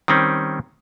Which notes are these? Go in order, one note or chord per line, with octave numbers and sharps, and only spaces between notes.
D#3 G3 C4 C#4